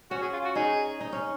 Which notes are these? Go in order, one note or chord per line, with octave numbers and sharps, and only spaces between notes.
C#4 F#4
G#4
F4
F#4
D#4 G#4
D#4
C#4